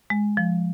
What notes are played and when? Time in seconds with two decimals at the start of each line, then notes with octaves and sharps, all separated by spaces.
0.10 G#3
0.37 F3